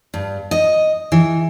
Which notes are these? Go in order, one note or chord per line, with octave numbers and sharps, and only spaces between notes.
G2
D#5
E3